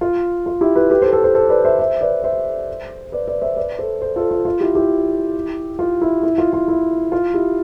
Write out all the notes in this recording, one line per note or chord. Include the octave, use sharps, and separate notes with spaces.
F4
F4
E4 G4
G4 B4
G4 B4
A4 C5
A4 C5
A4 C5
A4 C5
B4 D5
C5 E5
C5 E5
B4 D5
C5 E5
B4 D5
B4 D5
C5 E5
B4 D5
A4 C5
A4 C5
F4 A4
F4
F4
E4 G4
E4 G4
F4
E4
E4
F4
F4
E4
F4
E4 G4